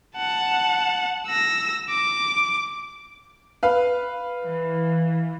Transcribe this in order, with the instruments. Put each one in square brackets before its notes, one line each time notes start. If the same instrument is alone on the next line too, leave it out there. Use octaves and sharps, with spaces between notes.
[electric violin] F#5 A5
E6 A#6
D6
[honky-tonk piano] B4 F5
[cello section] E3